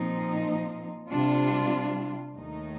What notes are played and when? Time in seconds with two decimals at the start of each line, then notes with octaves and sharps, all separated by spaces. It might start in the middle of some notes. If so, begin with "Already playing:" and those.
Already playing: A#2 F3 C4 D#4
1.10 C3 G3 D4 F4
2.35 D#2 D#3 A3 D#4